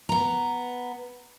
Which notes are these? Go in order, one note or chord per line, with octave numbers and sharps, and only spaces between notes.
B3 A#5